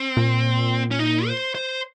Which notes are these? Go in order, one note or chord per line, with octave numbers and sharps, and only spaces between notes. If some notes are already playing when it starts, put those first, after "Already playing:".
Already playing: C4
A#2
C#4
D#4
C5
C5